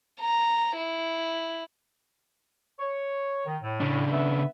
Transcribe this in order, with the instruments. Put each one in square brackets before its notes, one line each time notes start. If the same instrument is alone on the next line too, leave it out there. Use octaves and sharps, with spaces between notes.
[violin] A#5
E4
[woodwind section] C#5
D#3
A2
[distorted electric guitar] C#3 D4
[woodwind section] B3 B4 E5